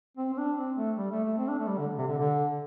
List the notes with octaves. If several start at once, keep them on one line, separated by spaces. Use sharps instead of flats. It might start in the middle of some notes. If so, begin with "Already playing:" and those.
C4
C4
D4
C4
A3
G3
A3
A3
C4
D4
A3
G3
D3
C3
D3
D3